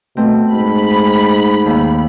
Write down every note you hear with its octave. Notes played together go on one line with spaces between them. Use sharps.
B2 A3 C4
G#2 B5
D#2